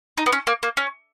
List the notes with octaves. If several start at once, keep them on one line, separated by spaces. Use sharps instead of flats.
D#4
B3
C#4
A#3
A#3
C#4